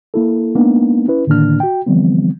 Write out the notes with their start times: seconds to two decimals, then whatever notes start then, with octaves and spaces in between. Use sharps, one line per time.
0.14 A#3 E4 A4
0.55 G#3 A#3 B3 D4 D#4
1.08 C#4 E4 B4
1.27 A2 D3 D#3 A#3 D4 F6
1.60 F#4 G5
1.86 D3 E3 F3 G3 B3 C4